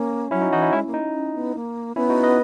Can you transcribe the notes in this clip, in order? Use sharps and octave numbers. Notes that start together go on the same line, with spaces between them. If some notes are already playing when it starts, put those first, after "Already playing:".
Already playing: A#3 C#4
F#3 C#4 E4
D#4 F#4
E3 D#4 F#4
C#4 E4
G#3 C#4 E4
A#3
D#4
C#4
B3
A#3
B3 C#4 E4
D#4 F#4
B4 D#5